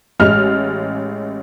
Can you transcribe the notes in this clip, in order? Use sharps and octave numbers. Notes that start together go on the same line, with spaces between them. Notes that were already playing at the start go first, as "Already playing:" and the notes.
A1 G#3 F6